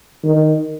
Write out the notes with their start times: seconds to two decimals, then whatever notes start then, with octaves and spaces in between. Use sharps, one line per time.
0.24 D#3